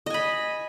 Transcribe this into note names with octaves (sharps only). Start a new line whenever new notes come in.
D#5 G#5 B5